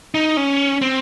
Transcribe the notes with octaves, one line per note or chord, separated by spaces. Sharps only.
D#4
C#4
C4